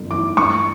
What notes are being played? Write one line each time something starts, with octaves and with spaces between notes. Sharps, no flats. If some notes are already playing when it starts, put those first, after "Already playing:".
Already playing: G1 F#2 E3
E3 D6
G2 C#6